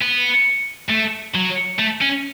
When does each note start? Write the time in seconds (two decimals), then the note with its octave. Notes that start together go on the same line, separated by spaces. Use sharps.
0.01 B3
0.90 A3
1.35 F#3
1.79 A3
2.01 C#4